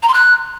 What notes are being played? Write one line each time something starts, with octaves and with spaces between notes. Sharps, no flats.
A#5
C6
F#6